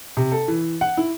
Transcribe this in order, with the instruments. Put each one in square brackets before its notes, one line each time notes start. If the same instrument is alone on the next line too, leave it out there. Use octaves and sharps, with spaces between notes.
[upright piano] C3
A4
E3
F#5
E4